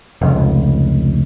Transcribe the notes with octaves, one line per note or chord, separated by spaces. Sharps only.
F1 C#2